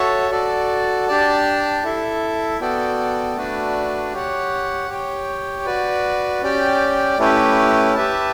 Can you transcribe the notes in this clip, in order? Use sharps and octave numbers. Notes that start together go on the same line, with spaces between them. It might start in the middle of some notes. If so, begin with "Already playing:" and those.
Already playing: F#4 A4 C#5 E5 A5
F#4 A4 D5
D4 G4 D5 A5
E4 A4 E5
B3 F#4 A4 D5 G5
A3 D4 F#4 B4 D5
G4 C#5 F#5
G4 C#5 G5
F#4 B4 D5
C#4 G4 D5 G5
A3 C#4 E4 G4 B4
G4 B4 E5 A5